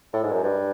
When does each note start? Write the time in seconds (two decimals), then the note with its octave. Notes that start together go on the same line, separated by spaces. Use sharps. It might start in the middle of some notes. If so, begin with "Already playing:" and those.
0.13 A2
0.23 G#2
0.32 F#2
0.43 G2